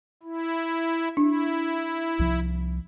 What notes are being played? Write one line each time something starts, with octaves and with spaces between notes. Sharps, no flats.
E4
D4 E4
C2 F3